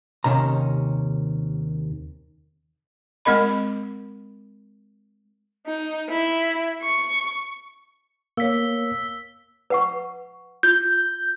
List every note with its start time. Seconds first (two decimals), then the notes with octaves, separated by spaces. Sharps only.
0.24 D#2 C3 D#3 C#4 A#5
3.25 G#3 C4 A#4 D#5 B5
5.67 D#4
6.09 E4
6.82 C#6
8.37 A#3 C#5 E6 B6
9.70 B4 F#5 C#6
10.63 F4 G6